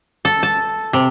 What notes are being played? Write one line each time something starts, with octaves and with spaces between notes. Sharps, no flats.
A4
A5
C3